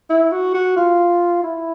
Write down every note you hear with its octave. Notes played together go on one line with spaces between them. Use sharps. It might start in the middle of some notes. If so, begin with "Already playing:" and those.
E4
F#4
F#4
F4
E4